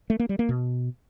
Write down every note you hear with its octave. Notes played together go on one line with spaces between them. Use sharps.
A3
A#3
G3
A#3
B2